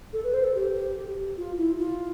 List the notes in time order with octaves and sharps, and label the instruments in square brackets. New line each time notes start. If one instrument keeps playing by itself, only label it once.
[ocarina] A4
B4
C5
A4
G4
F4
E4
F4